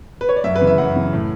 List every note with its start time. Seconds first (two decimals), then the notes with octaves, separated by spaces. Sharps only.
0.21 B4
0.29 C#5
0.36 D5
0.44 F#2 E5
0.56 B4
0.61 C#3 E3
0.67 E5
0.78 F#2 F#5
0.96 C#3 E3
1.13 A2